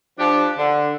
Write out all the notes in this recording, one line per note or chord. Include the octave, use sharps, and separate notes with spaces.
F3 D4 G4
D3